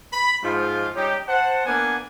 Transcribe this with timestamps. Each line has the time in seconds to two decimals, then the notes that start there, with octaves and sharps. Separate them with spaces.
0.13 B5
0.43 G#2 F3 F4
0.96 G3 C#4 D#4 G4
1.28 C5 F#5 A5
1.66 A#3 B3 D4 B4 F#5 G#5